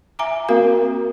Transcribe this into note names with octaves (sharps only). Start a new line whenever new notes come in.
E5 G#5 A#5 D6
A#3 C4 F#4 A#4 F5